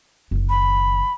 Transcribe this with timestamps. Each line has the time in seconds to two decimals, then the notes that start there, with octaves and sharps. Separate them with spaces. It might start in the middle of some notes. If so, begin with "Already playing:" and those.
0.31 F#1 D#3
0.49 B5